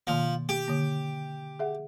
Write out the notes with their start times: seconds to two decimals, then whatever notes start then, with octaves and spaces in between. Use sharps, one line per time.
0.07 B2 D#3 F3 A#3
0.49 G4
0.68 D3 A#3
1.59 G#4 E5 F#5